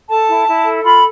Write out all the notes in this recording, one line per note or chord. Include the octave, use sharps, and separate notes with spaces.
A4 A5
E4
E4
A4
F4 B5